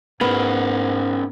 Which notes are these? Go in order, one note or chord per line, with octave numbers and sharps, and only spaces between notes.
G#2 B3 C#4 G#4 A#4